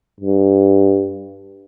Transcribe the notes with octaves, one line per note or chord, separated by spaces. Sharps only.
G2